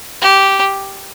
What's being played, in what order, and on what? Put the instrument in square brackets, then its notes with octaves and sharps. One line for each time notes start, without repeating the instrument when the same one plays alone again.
[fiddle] G4